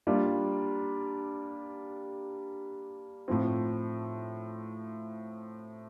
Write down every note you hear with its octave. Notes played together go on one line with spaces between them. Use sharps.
G3 A#3 D4 F4
A2 F3 C4